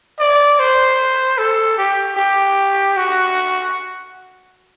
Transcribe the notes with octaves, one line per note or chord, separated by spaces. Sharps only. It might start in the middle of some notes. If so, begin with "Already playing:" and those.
D5
C5
A4
G4
G4
F#4